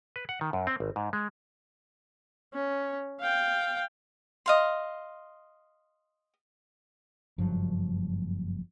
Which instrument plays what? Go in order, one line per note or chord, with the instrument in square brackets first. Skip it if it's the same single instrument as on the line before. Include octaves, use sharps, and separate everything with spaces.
[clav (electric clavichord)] B4
F#5
D#3
F#2
C4
G#1
G#2
G#3
[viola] C#4
F5 G5
[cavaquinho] D#5 F5 C6
[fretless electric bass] F#1 G2 F3 F#3